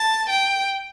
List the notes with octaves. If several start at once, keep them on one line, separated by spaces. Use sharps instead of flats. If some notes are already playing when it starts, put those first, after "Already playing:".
Already playing: A5
G5